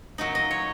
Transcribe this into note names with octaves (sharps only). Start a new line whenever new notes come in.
A#2 F#3 D#4 D#5
D#5
C#5